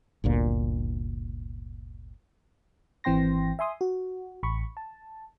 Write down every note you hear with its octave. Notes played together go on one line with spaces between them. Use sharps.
G1 D2 A#2
G#1 E3 C4 G5 C6 A#6
E5 G#5 C6 D#6
F#4
A1 B5 C#6
A5